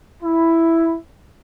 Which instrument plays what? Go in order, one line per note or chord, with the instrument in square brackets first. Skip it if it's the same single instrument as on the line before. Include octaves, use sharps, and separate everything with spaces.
[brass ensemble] E4